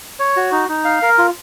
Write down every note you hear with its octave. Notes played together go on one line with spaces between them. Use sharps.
C#5
F#4
D#4
D#4
F5
A#4
F4